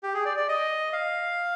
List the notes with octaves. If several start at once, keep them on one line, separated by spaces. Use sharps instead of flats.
G4
G#4
D5
D5
D#5
F5